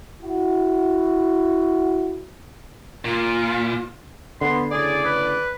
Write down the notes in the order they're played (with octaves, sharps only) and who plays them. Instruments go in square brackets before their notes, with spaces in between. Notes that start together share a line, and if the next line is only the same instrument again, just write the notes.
[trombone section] E4 F#4
[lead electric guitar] A#2 [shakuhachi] F4
[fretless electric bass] D3 [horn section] B3 [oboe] C6
[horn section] A2 C#3 D5 [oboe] G#4
[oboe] B4